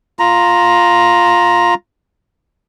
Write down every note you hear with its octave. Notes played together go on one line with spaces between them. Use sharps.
F4 A#5